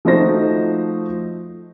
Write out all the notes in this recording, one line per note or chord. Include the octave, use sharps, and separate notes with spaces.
F3 A3 D#4 F#4 C5 A#6